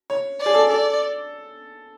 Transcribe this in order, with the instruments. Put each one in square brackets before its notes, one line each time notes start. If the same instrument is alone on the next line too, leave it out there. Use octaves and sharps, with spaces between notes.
[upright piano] C#5
[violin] D5
[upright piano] G#4
A4
[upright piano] A4 [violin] D5